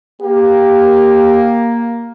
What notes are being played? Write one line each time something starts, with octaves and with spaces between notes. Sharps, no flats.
A#3 G4